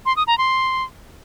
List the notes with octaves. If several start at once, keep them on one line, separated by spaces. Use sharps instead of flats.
C6
D#6
A#5
C6